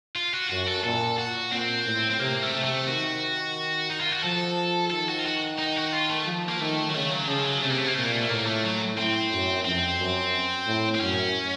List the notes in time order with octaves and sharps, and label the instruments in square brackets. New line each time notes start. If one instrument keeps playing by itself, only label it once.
[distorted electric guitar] F4
F#4
[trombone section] F#2 [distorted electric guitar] F#4
[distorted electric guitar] A4
[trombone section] A#2 [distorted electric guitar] A4
[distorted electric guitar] F#4
[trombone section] A#2 [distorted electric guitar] C4
[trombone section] A2
[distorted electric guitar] C4
[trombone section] C3 [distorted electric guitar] A#3
[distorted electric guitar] A3
[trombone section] C3
[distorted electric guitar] A3
[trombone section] D#3 [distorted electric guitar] F#4
[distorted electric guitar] D#4
F4
F#4
[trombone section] F3 [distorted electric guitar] A4
[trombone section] D#3 [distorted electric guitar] A4
[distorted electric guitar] F#4
F4
F#4
D#4
F#4
F4
A3
[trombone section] F3
[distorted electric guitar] A#3
[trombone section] D#3 [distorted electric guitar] A3
[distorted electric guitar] F#3
[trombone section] C#3 [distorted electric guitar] A3
[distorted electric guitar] F#3
[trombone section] C#3 [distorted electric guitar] F3
[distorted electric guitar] F#3
[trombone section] C3 [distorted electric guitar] A3
[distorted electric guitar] A#3
A3
A#3
[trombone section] A#2 [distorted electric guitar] A3
[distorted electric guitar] A#3
A3
A3
[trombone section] A2 [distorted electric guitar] A#3
[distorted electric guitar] A3
F#3
[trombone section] A2 [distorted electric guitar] C4
[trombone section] F#2
[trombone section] F2 [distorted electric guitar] C4
[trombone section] F#2
A2
[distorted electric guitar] C4
[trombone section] F#2 [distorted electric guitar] C#4